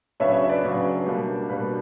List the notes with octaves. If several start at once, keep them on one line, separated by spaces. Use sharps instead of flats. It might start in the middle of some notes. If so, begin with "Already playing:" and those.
C#3 F#3 B3 D4 C#5 E5
C#5
E5
B4 D5
C#3 F#3 B3 D4
B2 G3 A#3 D4
B2 G3 A#3 D4 B4